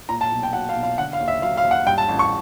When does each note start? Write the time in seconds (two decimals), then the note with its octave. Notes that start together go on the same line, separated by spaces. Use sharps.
0.09 A#2 A#5
0.21 A5
0.31 B1
0.43 G5
0.53 F#3 F#5
0.69 F5
0.75 B1
0.83 F5
0.98 D3 F#5
1.13 F5
1.20 D#2
1.28 E5
1.42 F#3 F5
1.57 F5
1.64 D#2
1.71 F#5
1.87 G2 G5
1.98 A5
2.09 A1
2.19 C#6